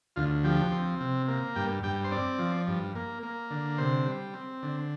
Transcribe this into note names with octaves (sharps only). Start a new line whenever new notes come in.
D2 F4
F3 G4
C4
C3
A#3
G2 G5
G2 G5
C5
C4 D5
F3
G2
A#3
A#3
D3
C3 C5
G3
C4
D3